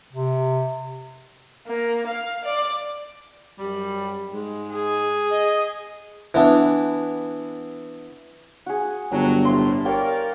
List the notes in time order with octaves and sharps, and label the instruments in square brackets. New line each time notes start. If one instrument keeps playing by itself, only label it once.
[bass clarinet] C3
[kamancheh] A#3
F5
D5
[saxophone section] F#2 G3
G#2 G#3
[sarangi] G#4
[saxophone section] D#5
[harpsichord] E3 B3 D4
[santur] F#4 G#4
[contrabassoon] G1 [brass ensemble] F#3 [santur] D4 A#4 G5
[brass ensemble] A2 C3 [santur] C6
[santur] G4 C#5 G5 [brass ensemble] A#4 D5 F5